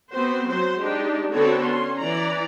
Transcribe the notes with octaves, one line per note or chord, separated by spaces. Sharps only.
B3 C4 F#4 C5
F#3 F#4 C5
G#3 D4 D#4 G4
D3 B3 C4 F#4 A4 C#5
C#4 C6
E3 D5 A#5